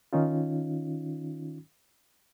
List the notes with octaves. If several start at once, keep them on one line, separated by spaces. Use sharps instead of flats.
D#3 C#4 D#4 F4